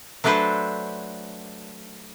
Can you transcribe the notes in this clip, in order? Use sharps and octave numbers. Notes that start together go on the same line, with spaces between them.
F#3 A3 D4 A4 B4 C5